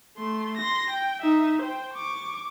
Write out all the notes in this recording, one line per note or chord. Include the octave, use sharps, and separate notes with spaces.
A3 C6
C6 A#6
G5
D#4 E5
C5 G5
C#6 D6